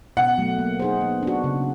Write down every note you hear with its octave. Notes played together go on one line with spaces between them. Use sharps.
B2 F#5
F#3 A3
A#3
D#4 G#4 C5
B3
D4 F#4
C#3